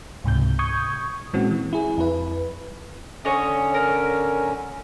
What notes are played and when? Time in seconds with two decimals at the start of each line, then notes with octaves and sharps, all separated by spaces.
0.24 C#2 G#2 C3 G6
0.59 C#6 D#6 G6 G#6
1.33 A#2 E3 G#3 C4 C#4 F#4
1.51 E3
1.73 E4 G#4
1.98 F2 E4 B4
3.25 D3 C#4 C#5 D#5
3.74 A#4